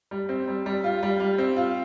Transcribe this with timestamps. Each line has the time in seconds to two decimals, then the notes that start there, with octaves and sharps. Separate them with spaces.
0.11 G3
0.29 C4
0.48 G3
0.66 G3
0.84 F4
1.03 G3
1.20 G3
1.38 C4
1.57 F4